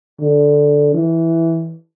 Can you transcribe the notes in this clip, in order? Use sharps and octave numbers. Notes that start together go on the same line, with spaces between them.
D3
E3